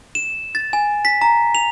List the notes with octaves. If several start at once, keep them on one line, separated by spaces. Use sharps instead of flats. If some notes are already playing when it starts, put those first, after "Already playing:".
E7
A6
G#5
B6
A#5
F7